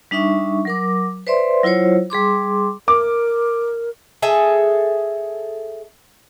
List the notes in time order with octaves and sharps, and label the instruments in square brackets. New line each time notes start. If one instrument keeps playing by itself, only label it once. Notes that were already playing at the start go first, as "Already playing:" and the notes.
[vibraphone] G3 D4 D#4 E5 C#6
F#3 A#4 D6
B4 C5 D5 E5 C6
F#3 E4 F4 C5 C#5
G3 G#4 C6 D6
[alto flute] A#4 [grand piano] D6
[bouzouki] G#4 A4 E5